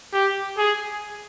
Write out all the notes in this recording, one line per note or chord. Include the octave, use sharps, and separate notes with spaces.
G4
G#4